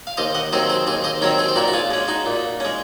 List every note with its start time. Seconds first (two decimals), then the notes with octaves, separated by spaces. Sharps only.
0.07 F5
0.17 D#2 C5 D#5
0.35 D#5 F#5
0.53 D#3 F#3 C4 C5 D#5
0.69 G#4 C5
0.87 D#2 G#4 C5
1.04 C5 D#5
1.21 D#3 F#3 C4 A#4 C#5
1.38 G#4 C5
1.48 C5
1.56 A#2 F#4 A#4
1.68 F#4
1.73 F4 G#4
1.91 G#3 C#4
2.08 D#4 F#4
2.26 A#2
2.60 G#3 C#4